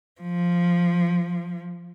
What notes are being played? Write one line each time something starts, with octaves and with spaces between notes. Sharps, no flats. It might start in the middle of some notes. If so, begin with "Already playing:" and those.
F3